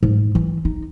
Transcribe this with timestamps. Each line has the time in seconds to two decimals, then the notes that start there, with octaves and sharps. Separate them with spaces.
0.03 G#2
0.35 E3
0.65 D#4